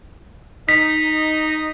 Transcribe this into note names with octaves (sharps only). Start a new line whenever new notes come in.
D#4 D#5 B6